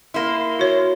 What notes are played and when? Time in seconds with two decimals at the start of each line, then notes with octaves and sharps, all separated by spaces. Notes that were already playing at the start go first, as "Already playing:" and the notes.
0.14 A#3 E4 C6
0.59 F#4 C#5